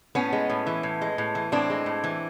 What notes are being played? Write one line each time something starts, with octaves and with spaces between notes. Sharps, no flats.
A2 B3 C#4
G#3
A2
E3
A2
G#3
A2
E3
A2 C4 D4
G#3
A2
E3